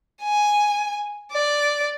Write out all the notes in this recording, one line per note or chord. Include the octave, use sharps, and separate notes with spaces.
G#5
D5